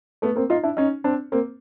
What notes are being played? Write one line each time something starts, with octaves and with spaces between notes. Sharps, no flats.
A3 B3
A#3 C4
D#4 F4
D4 E4
C#4 D#4
C4 D4
A#3 C4